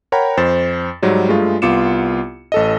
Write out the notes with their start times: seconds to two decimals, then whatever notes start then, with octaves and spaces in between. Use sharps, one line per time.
0.12 A#4 C#5 F#5 G5 A#5 B5
0.37 F2 C5 A6 E7
1.02 G#2 F#3 G3
1.29 G2 G#3 A3 F4 G#4
1.62 C2 B3 F4 D6 C#7 E7
2.52 A1 A4 D#5